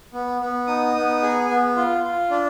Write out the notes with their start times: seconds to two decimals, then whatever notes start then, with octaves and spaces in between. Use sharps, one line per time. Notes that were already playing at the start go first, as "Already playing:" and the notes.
0.13 B3
0.41 B3
0.67 D#4 D#6
0.95 B3
1.22 G#4
1.49 B3
1.76 F4
2.04 F4
2.31 D4